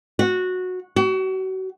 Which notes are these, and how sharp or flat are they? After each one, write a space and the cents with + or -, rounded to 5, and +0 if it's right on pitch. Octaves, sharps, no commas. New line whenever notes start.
F#4 -15
F#4 +35